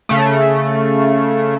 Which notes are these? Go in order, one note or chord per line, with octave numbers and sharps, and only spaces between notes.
C#3 A3